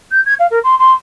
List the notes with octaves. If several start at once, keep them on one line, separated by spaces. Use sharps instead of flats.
G6
G#6
F5
A#4
C6
C6